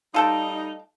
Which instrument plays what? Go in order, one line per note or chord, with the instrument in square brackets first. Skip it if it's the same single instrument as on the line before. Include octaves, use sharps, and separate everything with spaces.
[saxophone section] G3 A3 D#4 [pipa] F4 A4 G5